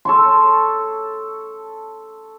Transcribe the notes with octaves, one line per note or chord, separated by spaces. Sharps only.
A4 C#5 C6